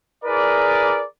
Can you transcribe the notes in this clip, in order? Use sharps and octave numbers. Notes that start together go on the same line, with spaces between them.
E4 G#4 A#4 B4 D5